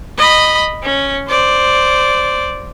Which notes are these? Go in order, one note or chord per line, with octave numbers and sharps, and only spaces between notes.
D#5 B5
C#4
C5 D5